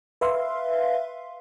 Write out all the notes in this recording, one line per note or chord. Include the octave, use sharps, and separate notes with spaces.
B4 E5 F5 C6